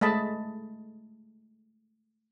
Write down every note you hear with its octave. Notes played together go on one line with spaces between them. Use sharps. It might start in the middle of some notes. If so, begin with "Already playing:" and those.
G#3 A3 D#5 A5 B5